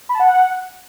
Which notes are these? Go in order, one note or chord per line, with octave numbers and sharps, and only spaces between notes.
B5
A5
F#5